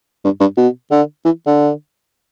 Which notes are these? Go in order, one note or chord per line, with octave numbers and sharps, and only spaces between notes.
G2
G2
B2
D3
E3
D3